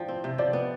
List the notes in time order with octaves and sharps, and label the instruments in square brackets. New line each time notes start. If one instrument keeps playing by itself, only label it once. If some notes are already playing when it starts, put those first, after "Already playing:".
Already playing: [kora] F3 D4 [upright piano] G5
[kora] C4
C3
[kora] F3 [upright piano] D5
[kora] B3